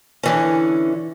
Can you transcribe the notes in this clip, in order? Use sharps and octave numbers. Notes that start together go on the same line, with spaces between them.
D3 E3 C#4